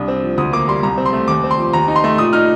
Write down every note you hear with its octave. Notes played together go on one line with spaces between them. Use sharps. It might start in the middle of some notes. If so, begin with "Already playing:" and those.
Already playing: C2 D4 D#6
C4
F3
D2 D#6
A#3 D6
G3 C6
C2 A#5
C4
C6
A3
D#2 D6
C4
C6
F3
D#2 A#5
D#4
C6
A3
A#2 D#6
D#4 F6